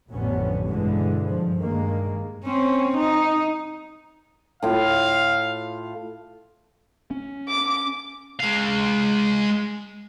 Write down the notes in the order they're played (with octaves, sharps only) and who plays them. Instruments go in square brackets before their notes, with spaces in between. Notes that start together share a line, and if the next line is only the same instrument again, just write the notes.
[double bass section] A1 F2 D3 G3 B3 C#4
G2 B2 D3 E3 G3 G#3
G2 F3
G2 D#3 G#3 A#3
[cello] C4 C#4
D#4
[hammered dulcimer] A2 F4 [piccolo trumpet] F5
[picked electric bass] C#4
[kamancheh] D6
[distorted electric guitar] G#3 F5